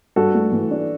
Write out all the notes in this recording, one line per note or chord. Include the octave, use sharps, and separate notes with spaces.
G2 F#4 A4
A3
E3
D4